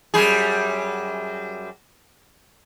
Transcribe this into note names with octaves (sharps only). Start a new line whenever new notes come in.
F#2 G3 G#4